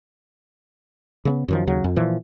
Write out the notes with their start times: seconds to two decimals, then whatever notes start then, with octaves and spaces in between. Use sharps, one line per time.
1.25 C#3 A#3 B3
1.48 F#2 D#3 F3
1.67 D#2 C#3 F#3
1.84 F2
1.96 A#2 E3 F3